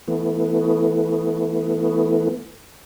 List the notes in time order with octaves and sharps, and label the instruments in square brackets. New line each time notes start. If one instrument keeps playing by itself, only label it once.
[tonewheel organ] E3 A3 B3